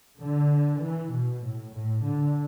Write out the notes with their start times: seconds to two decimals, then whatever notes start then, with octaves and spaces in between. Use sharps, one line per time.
0.21 D3
0.83 E3
1.13 B2
1.43 A2
1.74 A2
2.04 D3